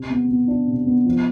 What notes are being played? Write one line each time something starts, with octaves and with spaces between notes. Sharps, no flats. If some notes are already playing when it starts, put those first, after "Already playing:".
Already playing: C3
B3
B3
D4
C3
B3
F3